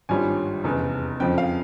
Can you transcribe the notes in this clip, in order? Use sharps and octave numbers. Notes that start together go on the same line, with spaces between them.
G#1 G2 G3 C#4 F4 G#5
F1 E2 C#3
F2 C#3 F3 G5
F5